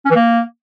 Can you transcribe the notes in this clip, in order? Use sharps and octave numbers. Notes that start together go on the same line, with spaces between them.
C#4
E3
A#3